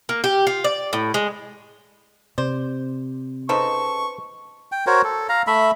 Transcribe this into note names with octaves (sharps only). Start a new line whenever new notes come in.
A#3
G4
F4
D5
A2
G#3
C3 C5 D5
C#3 D#4 A4 B4 C5 D#5 C#6
G5
F#4 A#4 C5 C#5
A4
F5 A#5
A3 E5 B5